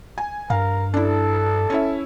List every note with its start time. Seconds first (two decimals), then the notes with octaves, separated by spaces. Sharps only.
0.18 G#5
0.50 G2 A#4 F5
0.94 D4 E4 A4
1.70 C#4 E4 E5